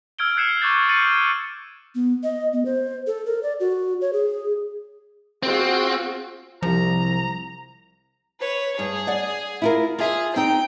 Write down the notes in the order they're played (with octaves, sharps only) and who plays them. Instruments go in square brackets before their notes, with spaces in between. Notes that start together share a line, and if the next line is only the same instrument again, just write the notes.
[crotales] E6 F6 G#6 D7 G7
E6 F#6 G#6 C7 C#7 E7
C#6 D6 G6 A6
C#6 A6 C#7 D#7 F#7
[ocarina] B3
D#5
B3
C5
A4
A#4
D5
F#4
C#5
G#4
[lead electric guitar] C4 [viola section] F4 F#4 G#4
[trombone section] C2 [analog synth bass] F3 [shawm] A#5
[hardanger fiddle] B4 C#5
[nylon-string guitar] G2 [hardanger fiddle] G#4
[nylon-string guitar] D5 F#5
E4 F4 A#4
[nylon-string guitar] F4 E5 G#5 [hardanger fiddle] G#4
[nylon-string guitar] C4 D#4 [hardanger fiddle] G5